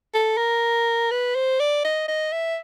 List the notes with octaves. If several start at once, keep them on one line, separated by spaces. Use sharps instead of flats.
A4
A#4
B4
C5
D5
D#5
D#5
E5